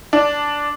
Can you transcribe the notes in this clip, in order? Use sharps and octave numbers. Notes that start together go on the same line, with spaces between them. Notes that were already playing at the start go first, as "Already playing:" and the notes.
D4